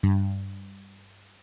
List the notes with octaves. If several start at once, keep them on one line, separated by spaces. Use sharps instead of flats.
G2